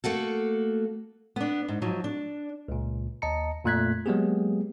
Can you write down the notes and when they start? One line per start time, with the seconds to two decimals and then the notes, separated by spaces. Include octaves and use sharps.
0.04 A3 A#3 F#4 A4
1.36 B3 D4
1.68 G#2
1.82 G#2 F3 F#3
2.04 D4
2.68 C#2 A#2
3.22 D#2 D#5 A5 A#5 C#7
3.64 F2 A#2 A3 F#6 G#6 B6
4.06 F#3 G#3 A#3 B3 G4 G#4